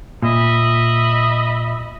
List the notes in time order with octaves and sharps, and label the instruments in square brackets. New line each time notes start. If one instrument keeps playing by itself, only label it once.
[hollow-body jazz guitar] A#2 [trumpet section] D#5 E5 B5